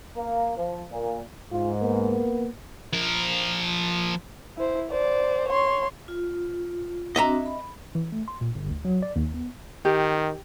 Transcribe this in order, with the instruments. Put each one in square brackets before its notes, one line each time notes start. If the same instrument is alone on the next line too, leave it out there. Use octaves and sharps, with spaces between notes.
[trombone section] A#3
F3
A#2
[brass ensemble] G#2 [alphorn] F4
[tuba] A#3 [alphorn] B3
[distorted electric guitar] F3 A#4
[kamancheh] E4 C5
C5 D5
C#5 C6
[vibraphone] F4
[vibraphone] C4 D4 F#4 [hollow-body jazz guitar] D#5 E5 A#5
[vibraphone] B5
[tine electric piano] E3
A3
C6
A#2
G1
D2
F#3
D5
D#2
B3
[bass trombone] D#3 [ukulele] G4